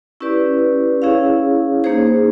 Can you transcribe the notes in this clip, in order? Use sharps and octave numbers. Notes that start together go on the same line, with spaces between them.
C#4 E4 G4 B4 D5
C#4 E4 G#4 C#5 F5
A#3 D#4 G#4 C5